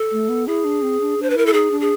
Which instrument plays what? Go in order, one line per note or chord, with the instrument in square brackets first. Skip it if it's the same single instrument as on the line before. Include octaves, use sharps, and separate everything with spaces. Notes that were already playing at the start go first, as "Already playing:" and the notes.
Already playing: [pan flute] A4
[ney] A3
B3
[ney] E4 [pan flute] G#4
[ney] D4
C4
D4
[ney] D4 [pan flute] C5
[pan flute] B4
[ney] E4 [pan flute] A#4
[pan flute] A4
[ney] D#4 [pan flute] G#4
[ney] D4
[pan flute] G#4